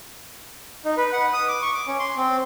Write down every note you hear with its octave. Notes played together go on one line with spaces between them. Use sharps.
D#4
B4
F#5
D#6
D6
C#6
D6
C#4
C6
C4